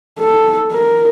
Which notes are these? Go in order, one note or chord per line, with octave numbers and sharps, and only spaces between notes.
A4
A#4